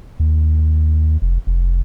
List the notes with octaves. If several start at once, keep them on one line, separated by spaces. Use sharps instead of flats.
D#2
F1
F1